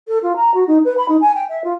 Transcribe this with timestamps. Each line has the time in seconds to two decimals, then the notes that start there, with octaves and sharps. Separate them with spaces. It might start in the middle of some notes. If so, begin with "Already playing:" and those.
0.08 A4
0.22 F4
0.36 A#5
0.54 F#4
0.67 D#4
0.84 B4
0.97 B5
1.08 D#4
1.21 G#5
1.35 G5
1.49 E5
1.64 F4